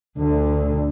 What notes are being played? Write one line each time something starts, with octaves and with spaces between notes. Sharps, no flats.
D2 D3